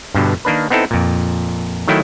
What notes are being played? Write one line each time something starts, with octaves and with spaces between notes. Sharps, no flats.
G2 B2 D3
D#3 A#3 D4 B4
B3 C4 D#4 E4 A4
F2 A#2
D#3 F#3 A3 E4 G5